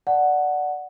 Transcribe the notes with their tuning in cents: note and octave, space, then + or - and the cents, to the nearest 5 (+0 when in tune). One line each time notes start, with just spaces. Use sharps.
D5 +0 F#5 +0 A5 +0